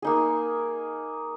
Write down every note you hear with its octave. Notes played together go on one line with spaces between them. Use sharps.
A#3 D#4 G#4